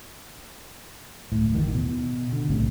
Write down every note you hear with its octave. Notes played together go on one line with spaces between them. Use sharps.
D1 A2
G#1 D#2 D#3 E3
B2
D3
B1 A2 C3